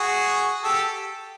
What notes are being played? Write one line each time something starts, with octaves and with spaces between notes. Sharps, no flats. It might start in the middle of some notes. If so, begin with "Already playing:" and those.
Already playing: F#4 G#4
G4 A4